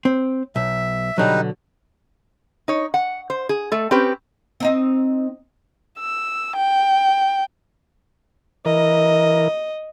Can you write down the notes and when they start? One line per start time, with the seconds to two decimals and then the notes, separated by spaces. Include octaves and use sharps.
0.05 C4
0.56 B1 E5
1.18 B2 D3 F#3 G3 D#4 B4
2.68 D#4 C#5
2.94 F#5
3.30 C5
3.49 G#4
3.72 A3 A4
3.91 C4 C#4 G4 B4
4.60 C4 D#4 D#5
6.00 E6
6.56 G5
8.66 E3 A#4 D#5